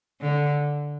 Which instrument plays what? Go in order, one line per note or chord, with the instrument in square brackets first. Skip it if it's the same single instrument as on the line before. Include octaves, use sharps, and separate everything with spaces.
[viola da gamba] D3